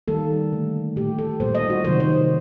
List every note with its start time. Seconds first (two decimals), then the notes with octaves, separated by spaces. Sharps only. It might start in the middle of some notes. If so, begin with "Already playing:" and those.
0.08 D#3 G3 A#3 A4
0.52 D3 A3
0.96 A#2 A3 G4
1.19 A4
1.40 A#2 G3 A#3 C5
1.55 D#5
1.70 F#4
1.84 C3 D#3 F#3 C5
2.00 C5